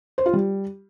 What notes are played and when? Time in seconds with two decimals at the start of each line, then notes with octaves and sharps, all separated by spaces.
0.18 C5
0.26 F4
0.33 G3